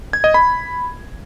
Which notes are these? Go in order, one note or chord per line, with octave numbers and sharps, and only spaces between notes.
G#6
D#5
B5